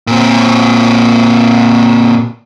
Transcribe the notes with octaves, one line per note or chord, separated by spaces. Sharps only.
A#2 C4